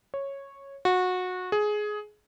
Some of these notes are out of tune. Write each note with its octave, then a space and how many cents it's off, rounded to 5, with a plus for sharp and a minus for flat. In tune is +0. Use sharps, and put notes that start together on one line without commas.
C#5 -10
F#4 -20
G#4 +15